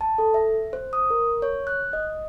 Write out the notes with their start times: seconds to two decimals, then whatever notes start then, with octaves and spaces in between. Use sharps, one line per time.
0.01 A5
0.18 A4
0.34 E5
0.73 C5
0.93 D#6
1.10 A#4
1.42 C#5
1.67 F#6
1.93 D#5